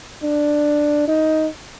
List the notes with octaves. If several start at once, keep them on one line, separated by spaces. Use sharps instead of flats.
D4
D#4